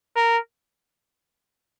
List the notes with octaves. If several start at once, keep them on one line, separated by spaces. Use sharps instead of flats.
A#4